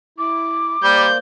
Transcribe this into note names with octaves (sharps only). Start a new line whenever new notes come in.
E4 D6
G3 A#3 C5 D5 G6